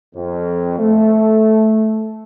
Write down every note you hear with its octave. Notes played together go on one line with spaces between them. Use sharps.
F2
A3